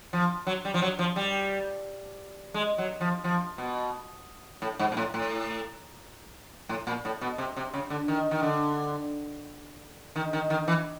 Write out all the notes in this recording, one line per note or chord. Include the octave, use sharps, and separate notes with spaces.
F3
F#3
G3
F3
F#3
F3
G3
G#3
F#3
F3
F3
B2
A2
G#2
A#2
A2
A2
A2
A#2
A2
B2
C3
C3
C#3
D3
D#3
D#3
D3
D#3
D#3
D#3
E3